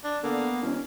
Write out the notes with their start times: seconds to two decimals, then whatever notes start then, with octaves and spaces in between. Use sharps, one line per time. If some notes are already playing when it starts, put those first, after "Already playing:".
0.04 D4
0.23 D3 A#3 B3
0.62 E1 C#4